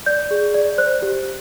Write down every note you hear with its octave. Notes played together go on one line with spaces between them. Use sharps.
D5 G6
G#4
D5
C5 F#6
G4